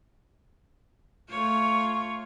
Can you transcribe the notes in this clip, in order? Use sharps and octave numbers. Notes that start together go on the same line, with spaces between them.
A3 F4 C#5